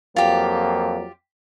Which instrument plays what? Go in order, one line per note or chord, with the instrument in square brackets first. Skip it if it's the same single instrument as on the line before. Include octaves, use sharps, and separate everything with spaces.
[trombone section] F2 F#3 A#3 [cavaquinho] F4 G4